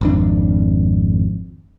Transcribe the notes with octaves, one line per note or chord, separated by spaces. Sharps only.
G#1 F2 D4